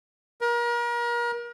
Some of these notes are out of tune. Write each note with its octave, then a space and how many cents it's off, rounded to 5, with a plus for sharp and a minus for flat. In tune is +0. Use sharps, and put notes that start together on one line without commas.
A#4 +35